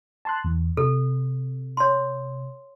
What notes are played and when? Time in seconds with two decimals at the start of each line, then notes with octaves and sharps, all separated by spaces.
0.25 A5 C6 F#6
0.44 E2
0.77 C3 A4
1.77 C#5 C6